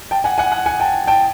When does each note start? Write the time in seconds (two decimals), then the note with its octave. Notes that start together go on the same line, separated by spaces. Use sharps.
0.11 G5 A5
0.24 F#5 G#5
0.38 F#5 G#5
0.52 F#5 G#5
0.66 F#5 G#5
0.80 G5 A5
1.08 G5 A5